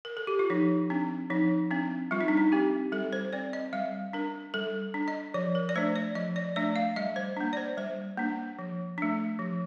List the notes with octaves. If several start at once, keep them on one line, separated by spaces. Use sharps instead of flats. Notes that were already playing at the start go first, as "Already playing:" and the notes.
A#4
A4
G4
F4
F3 D#4
C4 D4
F3 D#4
C4 D4
G3 F4
D#4
D4
D#4
C4 G4
G3 A4
C5
C4 D5
D#5
G3 F5
D4 A#4
G3 A4
D4
D#5
F3 D5
A#4
D5
A3 D4 C5
D5
F3 D#5
D5
A3 D4 D5
F5
G3 D#5
C5
A#3 D4
D5
C5
G3 C5
A#3 D4
F3
A3 D4
F3